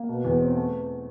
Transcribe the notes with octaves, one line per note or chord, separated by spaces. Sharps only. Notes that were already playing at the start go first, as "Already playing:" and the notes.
Already playing: A#3
B2
E2
C4
A3